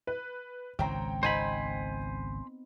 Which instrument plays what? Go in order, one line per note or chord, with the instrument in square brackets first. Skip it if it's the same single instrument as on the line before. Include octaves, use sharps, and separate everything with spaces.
[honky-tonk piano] B4
[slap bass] G#1 C#2 [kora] C4 C#5 [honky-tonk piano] G5 A#5
[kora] B3 C4 D#4 [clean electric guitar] C5 G#5 B5